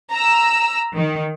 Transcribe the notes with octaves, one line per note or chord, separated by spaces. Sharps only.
A#5 E6
D#3